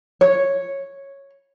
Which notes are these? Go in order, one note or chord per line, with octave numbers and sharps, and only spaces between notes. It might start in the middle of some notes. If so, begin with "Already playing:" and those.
C#5